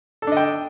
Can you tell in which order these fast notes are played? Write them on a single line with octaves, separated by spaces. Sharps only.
A4 D4 D#5 G5